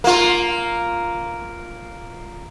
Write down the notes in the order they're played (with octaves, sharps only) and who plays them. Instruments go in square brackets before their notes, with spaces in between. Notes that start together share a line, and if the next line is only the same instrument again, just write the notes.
[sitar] A#3 F4